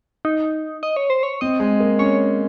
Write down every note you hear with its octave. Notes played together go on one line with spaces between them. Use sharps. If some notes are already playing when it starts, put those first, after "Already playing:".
D#4
D#5
C#5
C5
C#5
C4 D#5
G#3
A#3
C#4 C#5